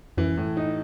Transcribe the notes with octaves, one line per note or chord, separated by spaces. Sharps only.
F#2 E3
A2
D#4